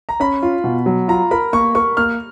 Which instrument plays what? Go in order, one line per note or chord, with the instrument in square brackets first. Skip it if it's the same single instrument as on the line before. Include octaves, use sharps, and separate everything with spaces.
[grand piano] A#5
[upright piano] C#4 [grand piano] B5
[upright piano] F4
B2
F#3
[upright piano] F4 [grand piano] A#5
[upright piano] A#4 [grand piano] B5
[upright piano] A#3 [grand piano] C#6
[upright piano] A#4 [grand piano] C#6
[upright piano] A#3 [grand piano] F6